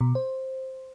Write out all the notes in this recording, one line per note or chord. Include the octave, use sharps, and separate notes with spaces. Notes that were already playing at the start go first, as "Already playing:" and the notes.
B2
C5